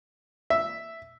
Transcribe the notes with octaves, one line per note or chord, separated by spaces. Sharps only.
E5